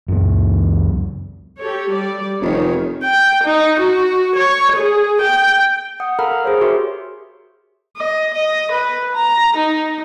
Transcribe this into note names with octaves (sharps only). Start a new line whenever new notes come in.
C#2 F#2
G4 A4 C#5
G3 D5
F1 D#3 C#5
G5
D#4
F#4
C#5
G#4
G5
F#5 D#6
A4 A#4 F5 A#5 B5 F6
G#4 C5 C#5
F#4 G4 A#4 E5 C6
D#5
D#5
B4
A#5
D#4